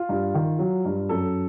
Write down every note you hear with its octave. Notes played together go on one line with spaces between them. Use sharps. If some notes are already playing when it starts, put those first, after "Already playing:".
Already playing: F4
G2
D#3
F#3
G2
F#2 A4